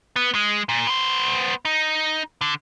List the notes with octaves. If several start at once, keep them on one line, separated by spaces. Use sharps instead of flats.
B3
G#3
A#2
B3 C5
D#4
D3